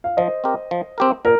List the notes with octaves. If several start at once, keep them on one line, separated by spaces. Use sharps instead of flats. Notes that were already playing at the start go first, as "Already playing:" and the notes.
F5
F3 C5 D#5
C4 G4 A#4
F3
C4 G4 A#4
A#2 A#4